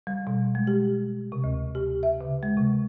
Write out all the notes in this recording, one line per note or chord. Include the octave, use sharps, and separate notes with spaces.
G3
B2
G#3
G4
C3
D2
G4
E5
C#3
G#3
C3